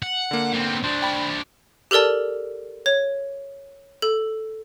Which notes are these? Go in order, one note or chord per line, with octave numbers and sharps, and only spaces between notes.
F#5
D3 A#3
B3 C4
D4 C5
G5 B5
G4 A4 A#4 D5 A5
C#5
A4